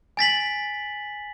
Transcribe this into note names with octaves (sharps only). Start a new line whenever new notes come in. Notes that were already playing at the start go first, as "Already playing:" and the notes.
G#5 A6 B6 F#7